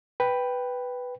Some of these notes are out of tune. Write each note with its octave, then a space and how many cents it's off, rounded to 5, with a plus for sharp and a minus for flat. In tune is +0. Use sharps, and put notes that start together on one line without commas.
B4 +0 G5 +0